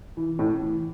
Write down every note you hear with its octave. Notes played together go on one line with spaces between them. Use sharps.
E3
A2
E3